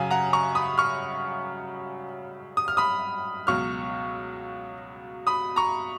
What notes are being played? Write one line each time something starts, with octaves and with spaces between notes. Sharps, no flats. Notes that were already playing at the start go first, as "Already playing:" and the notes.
Already playing: F#2 C#3 F#3 F5 G#5
F#5 A#5
A#5 C#6
B5 D#6
C#6 F6
D#6
F6
B5 D#6
C#2 B2 F#3 C#6 F6
B5 D#6
A#5 C#6